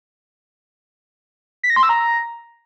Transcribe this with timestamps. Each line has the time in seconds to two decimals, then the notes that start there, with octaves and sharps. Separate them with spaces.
1.63 B6
1.70 A#6
1.76 C6
1.83 E6
1.89 A#5